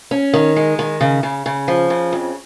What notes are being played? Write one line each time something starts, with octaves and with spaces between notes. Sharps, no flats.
C#4
D#3
G#3
D#3
C#3
C#3
C#3
F3
C#3
F2